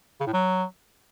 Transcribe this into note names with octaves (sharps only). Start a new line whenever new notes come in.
C#3
A2
F#3